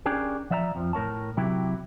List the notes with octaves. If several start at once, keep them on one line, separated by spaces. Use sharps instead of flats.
C#4 D4 G4 G#4 A#4
F3 D5 E5 F#5 A#5
F2 F3
A2 A#4 C#5 A5
C3 F#3 E4 G4